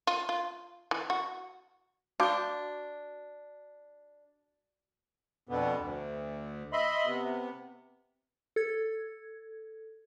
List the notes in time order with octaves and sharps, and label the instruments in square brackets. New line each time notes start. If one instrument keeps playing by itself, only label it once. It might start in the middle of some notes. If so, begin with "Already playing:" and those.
[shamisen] F4
F4
E3
F#4
[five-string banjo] D4 [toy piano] F#4 C#6 [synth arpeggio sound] F5 D6 G6
[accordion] F2 B2 D3 B3
D2
D#5 E5 B5 C6
C3 B3
[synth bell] A4 G#6